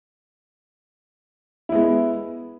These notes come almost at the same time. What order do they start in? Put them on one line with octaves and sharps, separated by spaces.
E4 B3 G#3